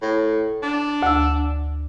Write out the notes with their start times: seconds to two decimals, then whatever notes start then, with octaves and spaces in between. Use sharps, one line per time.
0.02 A2
0.63 D4
1.02 D2 E6